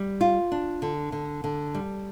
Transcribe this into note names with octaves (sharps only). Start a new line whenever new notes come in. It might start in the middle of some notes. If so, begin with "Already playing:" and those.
Already playing: G3
F4
D4
D3
D3
D3
G3